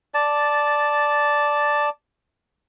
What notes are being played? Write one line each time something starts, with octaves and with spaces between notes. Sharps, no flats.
D5 A5